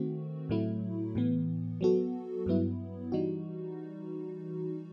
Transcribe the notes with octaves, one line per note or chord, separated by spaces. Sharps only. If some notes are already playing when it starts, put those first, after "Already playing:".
Already playing: D#3 A3 C4 F#4
A2 F#3 A3 E4
A2 E3 B3
F#3 B3 F#4 A4
G2 F#3 B3 E4
E3 G3 D#4 F#4